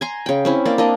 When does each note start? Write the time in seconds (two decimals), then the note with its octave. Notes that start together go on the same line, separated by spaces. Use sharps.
0.01 G#5 A#5 C6
0.26 C#3 G5
0.45 C4 C#4 E4
0.65 A#3 D5
0.78 A#3 D4 D#5